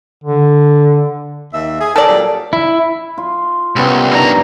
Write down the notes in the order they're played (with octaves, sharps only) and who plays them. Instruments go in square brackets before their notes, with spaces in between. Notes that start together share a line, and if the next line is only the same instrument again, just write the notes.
[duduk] D3
[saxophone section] D#2 E5
G#4
[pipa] A4 D5 [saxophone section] A#4
[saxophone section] A#2 F#3 G3
[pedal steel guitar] E4
[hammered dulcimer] F4
[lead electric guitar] C2 [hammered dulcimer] B3 C#4 G4
[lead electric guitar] G2 A#5 [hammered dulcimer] D4 D#4 A#4